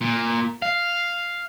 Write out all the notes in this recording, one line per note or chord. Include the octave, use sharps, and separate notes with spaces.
A#2
F5